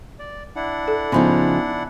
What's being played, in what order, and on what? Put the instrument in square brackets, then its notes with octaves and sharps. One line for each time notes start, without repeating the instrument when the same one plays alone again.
[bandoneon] D5
D4 E4 F#5
[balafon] A4
[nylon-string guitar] C#3 F3 D#4 [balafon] B3 B5